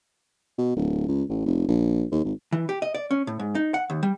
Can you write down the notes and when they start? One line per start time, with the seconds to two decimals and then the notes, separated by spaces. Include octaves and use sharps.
0.58 B2
0.76 D1
1.08 C#2
1.29 A1
1.46 F1
1.68 A#1
2.12 D#2
2.25 G#1
2.53 E3
2.69 G4
2.82 D#5
2.95 D5
3.11 C#4
3.27 A2
3.40 G#2
3.55 D#4
3.74 F#5
3.90 D#2
4.03 G3